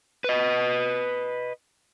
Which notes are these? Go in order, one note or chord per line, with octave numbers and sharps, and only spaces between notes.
B4 D#5